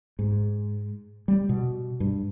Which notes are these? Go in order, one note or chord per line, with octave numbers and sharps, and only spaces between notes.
G#2
G3
B2
G2